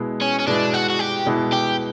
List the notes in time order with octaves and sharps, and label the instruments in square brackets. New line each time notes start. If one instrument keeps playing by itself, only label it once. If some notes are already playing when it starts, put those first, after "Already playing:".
Already playing: [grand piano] B2 G#3 B3 E4
[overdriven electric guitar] C#4
C#4
[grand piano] B2 G#3 B3 E4 [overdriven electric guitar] D4
[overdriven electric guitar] F#4
F#4
G4
[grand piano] B2 G#3 B3 E4
[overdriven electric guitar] G4